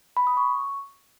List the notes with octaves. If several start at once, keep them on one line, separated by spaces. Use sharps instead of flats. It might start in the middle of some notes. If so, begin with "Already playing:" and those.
B5
D#6
C#6